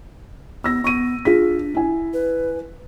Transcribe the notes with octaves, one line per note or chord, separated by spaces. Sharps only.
B3 E6 A#6
B3 C#6 D#7
D4 F4 G#4 B6
E4 G#5
B4